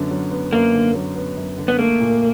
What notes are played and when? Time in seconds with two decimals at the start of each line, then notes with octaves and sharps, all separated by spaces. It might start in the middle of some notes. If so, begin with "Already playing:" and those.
Already playing: F#2 D3 F#3 B3
0.11 F#3
0.31 B3
0.53 F#2 A#3
0.73 D3
0.95 F#3
1.16 B3
1.37 F#2
1.58 D3
1.68 B3
1.79 A3 A#3
2.00 A#2